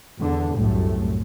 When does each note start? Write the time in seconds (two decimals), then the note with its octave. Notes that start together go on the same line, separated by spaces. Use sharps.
0.20 E2 D3
0.56 C2 F#2 A2 A3